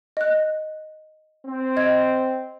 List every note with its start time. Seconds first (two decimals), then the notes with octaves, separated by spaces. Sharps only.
0.17 D#5 F#6
1.46 C4
1.77 D#5 G#6